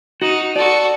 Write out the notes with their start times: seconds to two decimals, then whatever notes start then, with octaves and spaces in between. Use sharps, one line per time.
0.22 D#4 F#4
0.56 F#4 A4 D5